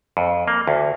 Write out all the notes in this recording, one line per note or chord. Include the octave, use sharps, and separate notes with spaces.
F2
A#3
D2